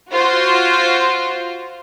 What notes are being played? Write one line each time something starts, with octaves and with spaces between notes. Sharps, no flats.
F4 F#4 C5